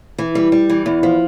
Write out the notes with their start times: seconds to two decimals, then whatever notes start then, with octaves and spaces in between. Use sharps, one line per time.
0.18 E3
0.35 G3
0.52 G3
0.69 E3
0.86 E2
1.03 F3